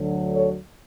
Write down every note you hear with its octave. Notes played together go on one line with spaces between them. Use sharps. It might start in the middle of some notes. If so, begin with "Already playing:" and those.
Already playing: D2 D3 F#3
A4 C#5